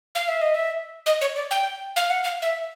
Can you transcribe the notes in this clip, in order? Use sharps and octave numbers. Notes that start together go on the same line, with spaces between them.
F5
E5
D#5
E5
D#5
C#5
D5
G5
F5
F#5
F5
E5